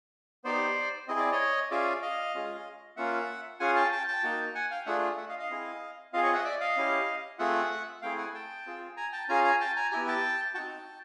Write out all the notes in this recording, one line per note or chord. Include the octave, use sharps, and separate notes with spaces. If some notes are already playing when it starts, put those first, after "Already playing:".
B3 D#4 G4 C5 D5
C4 E4 G#4 D#5
D5
C#5 D#5
C#4 F4 G#4 D5 E5
D#5 F5
G#3 C#4 F4 G#4
A#3 C#4 F4 E5 F#5
C#4 F4 G#4 F#5 G#5
G5 A5
G5 A5
G5 A5
A#3 D#4 F#4
F#5 G#5
F5 G5
A3 D4 F4 G#4 E5 F#5
E5 F#5
D#5 F5
D#5 F5
C4 E4 G#4
C4 F4 G#4 D#5 F5
C#5 D#5
E5 F#5
D#5
D5 E5
D#5 F5
C#4 E4 G4
A3 C4 F4 G#4 E5 F#5
A3 C4 E4 G#4 F5 G5
F#5 G#5
G5 A5
C4 F4 G#4
G#5 A#5
G5 A5
C#4 F4 G#4 G#5 A#5
G#5 A#5
G5 A5
G#5 A#5
B3 E4 G4 G#5 A#5
G5 A5
C4 D#4 F#4 G5 A5